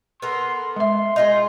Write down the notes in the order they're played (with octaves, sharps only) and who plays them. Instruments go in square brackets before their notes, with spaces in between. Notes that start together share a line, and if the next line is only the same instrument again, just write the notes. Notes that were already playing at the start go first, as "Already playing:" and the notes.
[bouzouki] B3 A4 A#4 [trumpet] C6
[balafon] G#3 E5 [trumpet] C6
[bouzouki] D#4 F4 G#4 [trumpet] C6